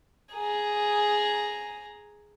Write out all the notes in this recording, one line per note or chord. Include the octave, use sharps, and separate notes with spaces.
G#4 A#5